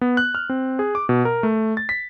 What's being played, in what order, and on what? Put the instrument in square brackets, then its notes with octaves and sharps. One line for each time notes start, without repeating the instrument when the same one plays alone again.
[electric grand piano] B3
F#6
F6
C4
G#4
D6
B2
A#4
A3
A6
B6